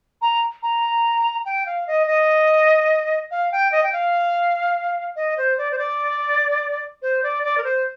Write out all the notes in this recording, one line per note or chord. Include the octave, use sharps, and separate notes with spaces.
A#5
A#5
G5
F5
D#5
D#5
F5
G5
D#5
G5
F5
D#5
C5
D5
C5
D5
C5
D5
D5
A#4
C5